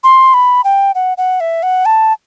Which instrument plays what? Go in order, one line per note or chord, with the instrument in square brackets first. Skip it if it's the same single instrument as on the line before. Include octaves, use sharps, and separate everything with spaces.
[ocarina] C6
B5
G5
F#5
F#5
E5
F#5
A5